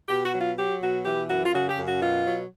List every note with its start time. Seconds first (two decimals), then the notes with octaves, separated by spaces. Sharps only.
0.09 B2 G4
0.24 F#4
0.33 F#3
0.41 F4
0.57 F#3 G4
0.81 B2 F#4
1.04 E3 G4
1.29 F#2 F#4
1.45 F4
1.54 C#3 F#4
1.69 G4
1.77 F#2
1.85 F#4
2.01 B2 F4
2.26 F#3